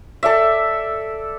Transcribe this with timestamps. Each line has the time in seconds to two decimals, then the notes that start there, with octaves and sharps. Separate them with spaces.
0.23 A4 D5 E5